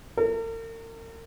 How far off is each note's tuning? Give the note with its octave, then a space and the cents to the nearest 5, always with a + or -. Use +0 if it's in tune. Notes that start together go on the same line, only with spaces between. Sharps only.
A#4 -45